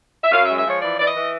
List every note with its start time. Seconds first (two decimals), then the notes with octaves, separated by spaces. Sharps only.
0.24 E5
0.31 F#2 F5
0.45 E5
0.49 G#3
0.58 E5
0.66 F3 C#5
0.82 E3 D5
0.99 E3 D5
1.07 D#5
1.15 E3